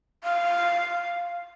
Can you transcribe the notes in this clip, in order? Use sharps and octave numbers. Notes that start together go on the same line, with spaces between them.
F5